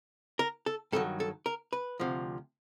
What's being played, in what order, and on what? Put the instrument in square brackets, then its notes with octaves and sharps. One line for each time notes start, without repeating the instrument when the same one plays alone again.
[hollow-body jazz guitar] A#4
A4
G2 D#3 F#3 A4
A4
A#4
B4
D2 C3 F3